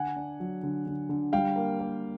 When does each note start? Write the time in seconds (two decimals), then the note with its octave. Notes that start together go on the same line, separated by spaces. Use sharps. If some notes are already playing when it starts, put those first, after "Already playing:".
Already playing: D3 F#5 G#5
0.16 D4
0.40 F#3
0.63 D3
0.86 D3
1.09 D3
1.33 G3 F5 G5
1.56 A#3
1.80 A#3